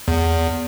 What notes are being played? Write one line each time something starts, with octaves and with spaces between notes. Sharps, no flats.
E2